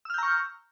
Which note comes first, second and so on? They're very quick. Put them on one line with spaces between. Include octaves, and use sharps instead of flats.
E6 F6 G6 A#5 C#6